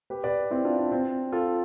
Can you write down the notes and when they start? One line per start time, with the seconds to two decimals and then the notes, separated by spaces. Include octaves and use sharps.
0.10 G4 B4
0.24 B4 D5
0.51 C4 E4
0.65 D4 F4
0.78 D4
0.92 C4
1.33 F4 A4